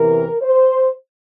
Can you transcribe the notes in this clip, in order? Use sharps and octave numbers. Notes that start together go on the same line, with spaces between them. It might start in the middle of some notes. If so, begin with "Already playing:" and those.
Already playing: E2 C3 E3 A#4
C5